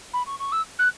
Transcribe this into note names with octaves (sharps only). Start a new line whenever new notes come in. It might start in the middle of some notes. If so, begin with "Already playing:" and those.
B5
C#6
C#6
E6
F#6